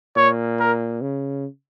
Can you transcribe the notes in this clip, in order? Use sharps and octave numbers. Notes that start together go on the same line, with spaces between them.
A#2 C#5
A#4
C#3